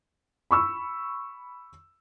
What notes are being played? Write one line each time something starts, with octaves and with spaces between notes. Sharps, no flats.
B5 C#6 E6